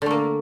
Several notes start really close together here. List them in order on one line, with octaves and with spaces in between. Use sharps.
D3 A3 A#3